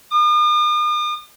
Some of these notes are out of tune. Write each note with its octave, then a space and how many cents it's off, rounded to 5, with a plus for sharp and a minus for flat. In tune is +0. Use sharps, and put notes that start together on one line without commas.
D#6 -45